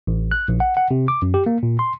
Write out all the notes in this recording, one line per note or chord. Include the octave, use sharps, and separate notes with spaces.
A1
F#6
A#1
F#5
F#5
C3
D6
F#2
G4
A#3
A#2
C6